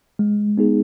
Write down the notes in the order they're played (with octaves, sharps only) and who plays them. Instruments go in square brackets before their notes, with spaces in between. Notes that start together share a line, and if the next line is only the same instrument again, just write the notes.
[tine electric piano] G#3
B3 D#4 G#4